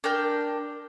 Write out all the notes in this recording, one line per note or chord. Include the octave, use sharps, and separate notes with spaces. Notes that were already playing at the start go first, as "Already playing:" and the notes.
D4 A#4 G5 G6